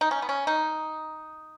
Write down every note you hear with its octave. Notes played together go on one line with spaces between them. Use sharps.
D#4
C#4
B3
C#4
D#4